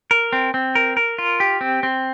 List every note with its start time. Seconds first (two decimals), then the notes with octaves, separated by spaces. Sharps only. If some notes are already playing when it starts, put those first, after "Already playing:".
0.11 A#4
0.33 C4
0.54 C4
0.75 A#4
0.97 A#4
1.19 F4
1.40 G4
1.61 C4
1.83 C4